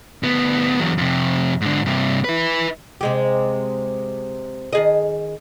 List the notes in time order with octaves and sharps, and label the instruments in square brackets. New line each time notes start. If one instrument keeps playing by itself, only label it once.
[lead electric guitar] D2 B3
E2 F#3
F2 C3
G#2 D3
G2 C3
E4 B4
[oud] C3 G#3 G4
D#3 G#4 D#5